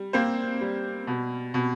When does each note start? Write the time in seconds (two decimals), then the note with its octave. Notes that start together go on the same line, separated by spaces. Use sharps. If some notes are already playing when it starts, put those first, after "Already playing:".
Already playing: G3
0.13 A#3 C4 C5
0.61 G3
1.07 B2
1.54 B2